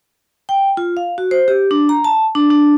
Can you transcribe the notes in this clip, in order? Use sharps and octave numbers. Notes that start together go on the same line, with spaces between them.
G5
F4
F5
F#4
C5
G4
D4
A#5
A5
D4
D4